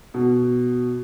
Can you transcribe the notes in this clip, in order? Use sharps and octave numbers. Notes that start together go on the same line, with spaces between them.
B2